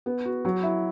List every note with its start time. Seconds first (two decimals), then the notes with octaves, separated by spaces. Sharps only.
0.06 B3
0.25 F#4
0.45 F#3
0.63 E4